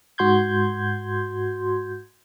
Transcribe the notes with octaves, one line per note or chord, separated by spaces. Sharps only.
G#2 F#4 C6 G6 G#6